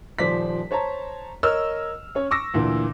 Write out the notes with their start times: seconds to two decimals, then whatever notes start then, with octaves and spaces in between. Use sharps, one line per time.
0.19 D#1 F3 C5 D5 B6
0.71 C5 C#5 A5 A#5
1.43 A#4 C#5 D#5 E6 F6
2.15 C#4 C#5
2.31 C#6 D6 E6 A#6
2.54 D2 A#2 E3